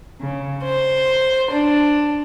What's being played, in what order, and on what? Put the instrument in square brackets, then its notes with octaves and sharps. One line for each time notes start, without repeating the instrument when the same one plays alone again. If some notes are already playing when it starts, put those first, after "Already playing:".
[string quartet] C#3
C5
D4